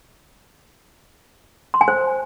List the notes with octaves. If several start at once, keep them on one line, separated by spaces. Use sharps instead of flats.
C6
G#5
C5